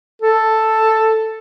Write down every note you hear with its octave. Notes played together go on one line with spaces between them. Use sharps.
A4